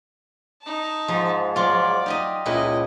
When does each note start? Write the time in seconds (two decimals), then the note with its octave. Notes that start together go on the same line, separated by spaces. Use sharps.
0.63 D#4 A5
1.08 G#2 F3
1.56 F#3 F4 D5
2.06 D#4 G4 D#5
2.46 C#2 A#2 E4 B4 D#5